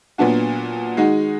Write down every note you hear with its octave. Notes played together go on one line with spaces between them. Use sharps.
A#2 F#3 B3 D4 F#4
D#3 G#3 D#4 F#4